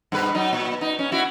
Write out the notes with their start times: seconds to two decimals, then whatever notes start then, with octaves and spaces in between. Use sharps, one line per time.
0.12 G2 B2 B4
0.35 F#3 D#4
0.53 A#2
0.81 D#4
0.99 C#4
1.12 E4 F#4